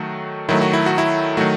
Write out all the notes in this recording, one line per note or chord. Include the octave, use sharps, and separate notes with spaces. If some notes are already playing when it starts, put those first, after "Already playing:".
Already playing: D#3 F#3 A3 F#4
D#3 F#3 A3 E4
F#4
E4
F#4
E4
D#3 F#3 A3 F#4